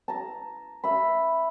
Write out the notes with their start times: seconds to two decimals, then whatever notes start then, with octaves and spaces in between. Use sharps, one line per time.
0.08 A5 A#5
0.84 E5 B5